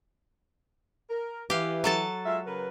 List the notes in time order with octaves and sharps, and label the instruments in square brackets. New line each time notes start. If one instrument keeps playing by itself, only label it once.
[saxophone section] A#4
[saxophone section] E3 [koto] G4 F5
[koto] F#3 A4 A5
[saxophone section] G#3 F4 E5
C#3 A#4 B4